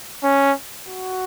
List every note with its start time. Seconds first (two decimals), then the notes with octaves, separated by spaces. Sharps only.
0.23 C#4
0.88 F#4